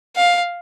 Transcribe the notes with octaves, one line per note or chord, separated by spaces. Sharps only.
F5